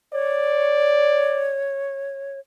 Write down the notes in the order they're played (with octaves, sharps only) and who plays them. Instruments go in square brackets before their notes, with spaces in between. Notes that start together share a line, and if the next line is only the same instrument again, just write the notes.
[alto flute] C#5 [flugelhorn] D5